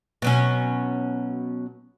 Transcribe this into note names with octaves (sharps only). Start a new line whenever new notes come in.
B2 F#3 C#4